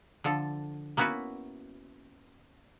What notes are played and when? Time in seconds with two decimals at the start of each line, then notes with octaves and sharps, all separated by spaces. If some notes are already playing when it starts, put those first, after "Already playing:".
0.24 D3 F3 A4
0.97 A#3 B3 C#4 E4 F#4 B4